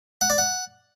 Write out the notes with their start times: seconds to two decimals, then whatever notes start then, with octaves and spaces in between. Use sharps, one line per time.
0.21 F#5
0.30 D5
0.38 F#5